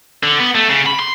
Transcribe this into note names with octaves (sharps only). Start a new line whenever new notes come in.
D3
B3
A3
C#3
B5
C6